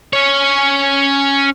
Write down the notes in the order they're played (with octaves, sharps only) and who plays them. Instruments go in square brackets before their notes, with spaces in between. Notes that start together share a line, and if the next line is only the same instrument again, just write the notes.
[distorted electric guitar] C#4 C#5